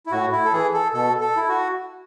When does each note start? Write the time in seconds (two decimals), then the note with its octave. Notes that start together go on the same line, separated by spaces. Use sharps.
0.06 E4
0.12 A2 F#4
0.32 E4
0.45 A4
0.53 E3 G#4
0.74 A4
0.94 B2 A4
1.21 A4
1.36 E4
1.49 F#4